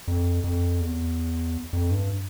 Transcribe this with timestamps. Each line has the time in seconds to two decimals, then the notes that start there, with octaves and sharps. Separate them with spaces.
0.08 F2
0.44 F2
0.80 E2
1.73 F2
1.91 G2